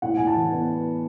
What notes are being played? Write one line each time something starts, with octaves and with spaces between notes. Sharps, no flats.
A2 F#5
A2 G#5
A5
E3
B3